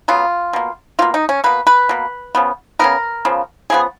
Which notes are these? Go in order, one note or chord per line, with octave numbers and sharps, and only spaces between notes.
C#3 F#3 B3 F4
B2 A#3
B2 A#3 F4
D#4
C#4
B2 A#3 B4
B4
B2 A#3
C#3 F3 B3
C#3 F3 B3 A#4
C#3 F3 B3
C#3 F3 B3 G#4